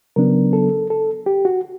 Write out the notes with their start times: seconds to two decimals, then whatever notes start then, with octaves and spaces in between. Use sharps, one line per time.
0.16 C#3 F#3 B3 D4 A#4
0.53 A4
0.90 A4
1.26 G4
1.45 F#4